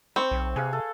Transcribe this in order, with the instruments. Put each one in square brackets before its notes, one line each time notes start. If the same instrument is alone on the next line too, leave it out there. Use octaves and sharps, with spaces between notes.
[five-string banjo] C4 [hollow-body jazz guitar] C5 B5 [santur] C#6
[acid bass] B1
[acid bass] C3 [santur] G#4 B4 F5
[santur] A4